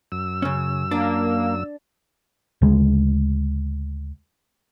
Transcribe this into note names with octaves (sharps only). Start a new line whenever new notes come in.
F#2 E6
C#3 C#4
A#3 D4
D2 C#3 G#3